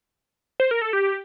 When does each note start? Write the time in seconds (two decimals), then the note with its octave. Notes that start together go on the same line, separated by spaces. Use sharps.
0.60 C5
0.71 A#4
0.82 A4
0.93 G4